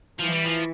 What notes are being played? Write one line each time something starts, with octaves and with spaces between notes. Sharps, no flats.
E3 F3
G3
F3